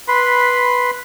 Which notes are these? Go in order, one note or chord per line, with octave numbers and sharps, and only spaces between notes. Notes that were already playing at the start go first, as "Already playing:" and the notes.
B4 B5 C6